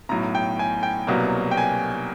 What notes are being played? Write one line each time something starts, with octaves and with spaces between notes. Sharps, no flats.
B1 A2 F#3 A#5
G5
G#5
G5
C2 B2 F#3 A#3
G5
G#5